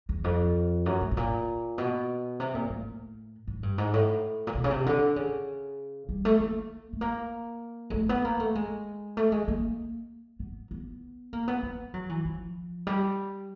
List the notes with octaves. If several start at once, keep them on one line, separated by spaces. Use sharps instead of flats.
E2
F2
F#2
A2
A2
A#2
B2
C3
A#2
A2
G#2
G2
G#2
A2
A#2
B2
C#3
C3
D3
C#3
G3
A3
A#3
A3
A#3
G#3
A3
B3
A#3
A3
G#3
A3
G#3
A#3
B3
B3
A#3
B3
B3
F#3
E3
F3
G3